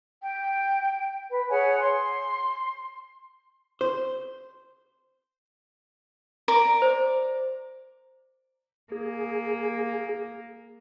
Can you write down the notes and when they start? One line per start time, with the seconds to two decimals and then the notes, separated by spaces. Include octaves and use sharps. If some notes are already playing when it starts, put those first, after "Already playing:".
0.21 G5
1.29 B4
1.50 G#4 C#5 F#5 G#5
1.81 C6
3.81 C5
6.48 A#4 D5 D6
6.82 C5
8.92 A#3 G#4